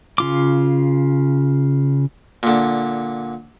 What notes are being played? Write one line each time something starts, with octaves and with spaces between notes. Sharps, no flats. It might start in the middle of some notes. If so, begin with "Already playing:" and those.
C#3 F4 D6
A#2 D3